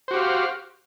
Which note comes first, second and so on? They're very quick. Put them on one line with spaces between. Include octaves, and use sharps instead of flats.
C5 F#4 G4 F5